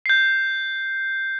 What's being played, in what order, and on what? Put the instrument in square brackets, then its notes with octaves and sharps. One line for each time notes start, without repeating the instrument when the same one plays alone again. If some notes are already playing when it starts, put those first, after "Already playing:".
[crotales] G6 C7